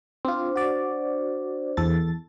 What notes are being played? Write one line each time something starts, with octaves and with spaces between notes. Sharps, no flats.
C4 D4 F4 C5
F#4 D5
E2 A4 A6